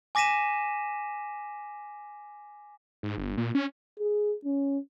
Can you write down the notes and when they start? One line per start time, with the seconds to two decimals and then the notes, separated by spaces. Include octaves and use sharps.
0.15 G#5 D6 A#6 B6 D#7 E7
3.03 G#2
3.18 G1
3.38 A#2
3.55 C#4
3.99 G#4
4.45 C#4